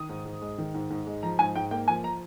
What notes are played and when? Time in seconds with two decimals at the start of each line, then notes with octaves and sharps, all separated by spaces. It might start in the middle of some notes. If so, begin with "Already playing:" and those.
Already playing: D#3 D#6
0.09 G#2
0.25 G#2
0.42 G#3
0.58 D#3
0.74 G#2
0.90 G#2
1.06 G#3
1.23 F3 A#5
1.39 G#2 G#5
1.56 G#2 G5
1.71 A#3 G5
1.88 F3 G#5
2.04 A#5